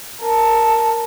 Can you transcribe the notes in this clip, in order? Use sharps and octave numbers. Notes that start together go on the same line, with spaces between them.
A#4 A5